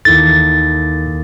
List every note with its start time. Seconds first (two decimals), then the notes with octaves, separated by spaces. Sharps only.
0.05 D#2 E4 A4 A6